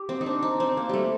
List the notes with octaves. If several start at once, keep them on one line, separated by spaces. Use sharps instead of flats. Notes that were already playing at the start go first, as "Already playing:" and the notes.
Already playing: G4
C4
D#4
D4
D#4
C4
A#3
G3 A3